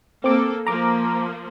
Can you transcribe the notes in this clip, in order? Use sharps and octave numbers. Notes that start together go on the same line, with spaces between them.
A#3 C4 A4 D6
F3 A#3 A#5 D6